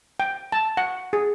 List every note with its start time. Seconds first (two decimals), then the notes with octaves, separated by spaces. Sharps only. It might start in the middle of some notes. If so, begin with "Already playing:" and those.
0.20 G5
0.52 A5
0.77 F#5
1.13 G#4